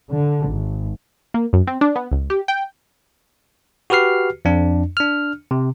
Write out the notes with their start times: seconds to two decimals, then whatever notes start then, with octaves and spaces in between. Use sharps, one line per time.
0.11 D3
0.48 G#1
1.34 A#3
1.53 F#2
1.67 C4
1.81 D4
1.96 B3
2.12 C#2
2.30 G4
2.48 G5
3.90 F#4 G4 B4 F6 C7
4.45 F2 D4
4.97 D4 F6
5.51 C3